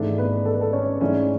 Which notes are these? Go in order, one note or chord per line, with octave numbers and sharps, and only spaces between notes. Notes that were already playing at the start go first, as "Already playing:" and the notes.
Already playing: G#1 G#2 E3 A3 D4 D5
B3 B4
A4
B4
A4
C#4 C#5
G#2 E3 A3 C#4 D4 C#5